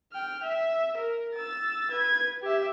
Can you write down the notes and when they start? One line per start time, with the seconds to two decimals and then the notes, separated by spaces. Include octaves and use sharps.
0.13 G5 F6
0.43 E5
0.97 A#4
1.35 E6 A6
1.91 B4 G#6
2.42 G4 E5